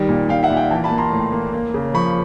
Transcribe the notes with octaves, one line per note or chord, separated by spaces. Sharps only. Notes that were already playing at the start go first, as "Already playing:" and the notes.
Already playing: D#3 G3
A#2
A#2 F5 G5
E5 F#5
A#2
F5 G5
E3 G5 A5
A5 B5
A#3
A#5 C6
A2
A#3
A#3
C#3
F3 B5 C#6